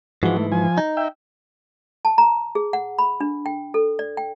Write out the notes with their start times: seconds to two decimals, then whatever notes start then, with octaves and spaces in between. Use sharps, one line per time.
0.23 G#2 E3 F3 G#3 F#4
0.37 A3
0.52 F3 G#5
0.78 D#4
0.97 E5 G5
2.05 A5
2.18 A#5
2.55 G#4
2.73 F#5
2.99 B5
3.21 D4
3.46 G5
3.74 A4
3.99 D5
4.17 G5